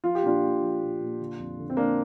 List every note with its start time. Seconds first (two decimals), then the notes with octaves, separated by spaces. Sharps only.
0.04 F3 F4
0.15 G4
0.23 A#2 D4 F4
0.43 A#2
0.61 F3
0.81 A#2
1.00 A#2
1.20 D3
1.39 F2
1.58 D3
1.70 C4
1.77 D3 A#3 D4